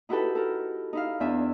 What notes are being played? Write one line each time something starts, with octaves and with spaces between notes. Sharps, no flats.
D#4 E4 F#4 G4 A4 B4
A4 A#4
D#4 E4 F5
E2 D4 E5 G#5